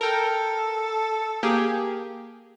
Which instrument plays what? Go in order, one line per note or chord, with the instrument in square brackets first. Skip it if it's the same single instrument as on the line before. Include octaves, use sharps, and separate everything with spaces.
[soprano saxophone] A4 [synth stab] A#4 G5
[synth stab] A#3 G4 G#4